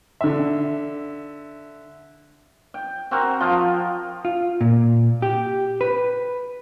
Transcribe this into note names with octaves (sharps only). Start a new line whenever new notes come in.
D3 E5
G5
C4 F#4 A#4
F3 F4
F4
A#2
G4
B4